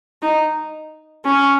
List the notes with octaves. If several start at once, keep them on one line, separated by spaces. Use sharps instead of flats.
D#4
C#4